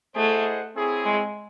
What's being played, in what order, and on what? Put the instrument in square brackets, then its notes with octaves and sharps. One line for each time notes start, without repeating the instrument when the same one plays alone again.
[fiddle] A3 [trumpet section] E4 G#4 C5 D#5 F#5
[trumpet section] C4 E4 G#4 C#5
[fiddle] G#3